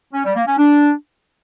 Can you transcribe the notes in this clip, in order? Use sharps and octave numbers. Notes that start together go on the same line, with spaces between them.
C#4
G3
A#3
C#4
D4